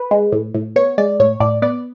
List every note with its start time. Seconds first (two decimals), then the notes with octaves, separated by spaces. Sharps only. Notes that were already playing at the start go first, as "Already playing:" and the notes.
Already playing: B4
0.11 G#3
0.32 A2
0.54 A2
0.76 B3 C#5
0.98 G#3 D5
1.20 A2 C#5
1.40 A2 D5
1.62 B3 D5